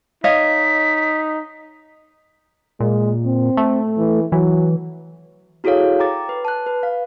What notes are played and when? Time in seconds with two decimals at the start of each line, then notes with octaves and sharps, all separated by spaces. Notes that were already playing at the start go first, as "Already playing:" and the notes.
0.24 D#4 C#5 D#5 F5 B6
2.80 A#2 G#3
3.26 C4
3.57 A3
3.98 E3
4.32 E3 F#3
5.64 E4 F#4 G#4 A4 C#5 F5
5.99 G5 A#5 D6 A6
6.29 B4
6.45 A5 F#6
6.66 B4
6.83 F5